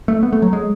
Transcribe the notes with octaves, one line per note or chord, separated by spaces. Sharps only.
A3
B3
A3
F#3
G#3